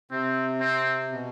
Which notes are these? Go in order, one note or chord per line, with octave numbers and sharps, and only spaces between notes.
C3 C4
C4
B2